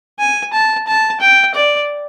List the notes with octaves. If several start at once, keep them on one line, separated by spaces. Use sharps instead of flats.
G#5
A5
A5
G5
D5